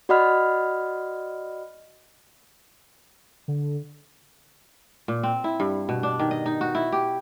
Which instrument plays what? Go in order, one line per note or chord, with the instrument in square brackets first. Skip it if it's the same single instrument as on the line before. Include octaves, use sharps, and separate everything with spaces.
[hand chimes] F#4 D5 D#5 F#5 B5 F6
[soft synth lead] D3
[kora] A#2
C4
E4
G2
B2
D4
D#3
D#5
D#4
F#4
E4
G4